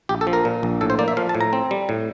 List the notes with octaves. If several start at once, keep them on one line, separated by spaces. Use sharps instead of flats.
A#1 G4
A4
F3
A#4
A#2
A#1
A2 A4
C5
A#3 D5
E5
F3 F5
A5
A2
A#5
C4
G3
A2